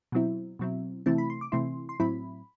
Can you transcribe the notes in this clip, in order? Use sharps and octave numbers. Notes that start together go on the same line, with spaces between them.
B2 F#3 C4 E4
B2 F#3 C4 E4
C3 E3 A3 C4 E4 A5
B5
C6
D6
C3 E3 A3 C4 E4 C6
C6
A2 F#3 C4 E4 B5